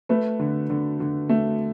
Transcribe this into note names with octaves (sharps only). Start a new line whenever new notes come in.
A3 B4
D3
D3
D3
A3